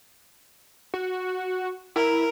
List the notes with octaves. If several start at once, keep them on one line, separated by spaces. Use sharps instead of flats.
F#4
E4 A#4